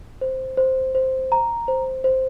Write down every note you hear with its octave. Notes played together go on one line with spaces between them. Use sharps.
C5
C5
C5
A#5
C5
C5